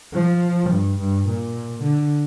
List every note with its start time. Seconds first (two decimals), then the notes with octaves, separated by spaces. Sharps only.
0.13 F3
0.70 G2
0.98 G2
1.26 A#2
1.82 D3